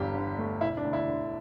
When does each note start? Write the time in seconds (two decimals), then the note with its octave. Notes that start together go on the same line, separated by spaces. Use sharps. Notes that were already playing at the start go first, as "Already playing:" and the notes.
Already playing: G1 E2 G2 G4
0.15 D3
0.38 A3
0.61 E1 E4
0.77 D4
0.85 D2
0.93 E4
1.08 D3